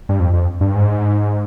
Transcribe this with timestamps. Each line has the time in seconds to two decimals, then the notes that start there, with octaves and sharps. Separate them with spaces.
0.09 G2
0.20 F2
0.34 F2
0.61 G2
0.75 G#2